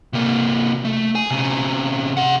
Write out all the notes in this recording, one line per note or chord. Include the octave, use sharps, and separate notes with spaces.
C3 A#3
A3
G#4 G#5
C3 C#4
G#4 F#5